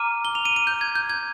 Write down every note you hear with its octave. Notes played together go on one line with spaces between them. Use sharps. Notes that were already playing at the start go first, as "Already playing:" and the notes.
Already playing: A#5 D6 F6 D#7
G7
F7
D#7
D#7
G6
G#6
G6
G#6